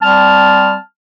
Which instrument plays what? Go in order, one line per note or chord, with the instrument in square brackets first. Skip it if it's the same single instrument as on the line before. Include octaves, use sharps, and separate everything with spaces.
[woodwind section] G3 C4 A5 F6